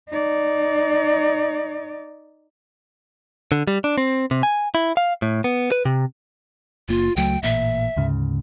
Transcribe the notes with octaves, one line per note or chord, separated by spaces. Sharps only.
D#4 D5
D3
G3
D4
C4
C3
G#5
E4
F5
A2
B3
B4
C3
F#1 A#3 F4
C#2 F#3 A3 G5
A1 A#2 E5
D2 G#2 C#3